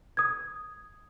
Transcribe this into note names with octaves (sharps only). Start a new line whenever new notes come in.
D#6 G#6